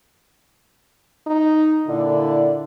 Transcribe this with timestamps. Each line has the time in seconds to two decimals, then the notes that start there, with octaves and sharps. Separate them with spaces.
1.27 D#4
1.88 A#2 D3 E4 D5